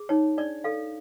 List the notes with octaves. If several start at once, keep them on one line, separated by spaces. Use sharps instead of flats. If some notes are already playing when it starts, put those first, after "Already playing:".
Already playing: G#4
D#4 C#5
D4 D5
A4 F5